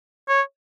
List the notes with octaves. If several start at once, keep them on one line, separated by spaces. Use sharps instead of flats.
C#5